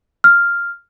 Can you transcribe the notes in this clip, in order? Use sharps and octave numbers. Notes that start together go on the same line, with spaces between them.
F6